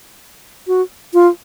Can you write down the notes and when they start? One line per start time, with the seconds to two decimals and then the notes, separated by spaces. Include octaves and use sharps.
0.67 F#4
1.14 F4